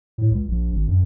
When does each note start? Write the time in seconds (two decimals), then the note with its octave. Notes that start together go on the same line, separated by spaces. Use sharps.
0.18 A2
0.31 C#2
0.48 A#1
0.72 G#1
0.87 F#2